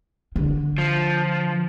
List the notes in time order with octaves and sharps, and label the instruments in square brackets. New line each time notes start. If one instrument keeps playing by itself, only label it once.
[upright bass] D3
[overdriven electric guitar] F3